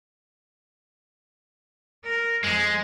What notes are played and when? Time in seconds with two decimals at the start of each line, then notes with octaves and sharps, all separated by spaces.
2.04 A#4
2.44 F2 G#3